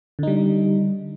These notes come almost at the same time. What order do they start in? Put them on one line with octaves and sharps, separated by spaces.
D3 D#4 G3